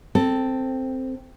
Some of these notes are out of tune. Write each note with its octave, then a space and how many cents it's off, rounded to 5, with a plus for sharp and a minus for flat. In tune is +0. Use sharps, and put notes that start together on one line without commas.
C4 +0 A4 +10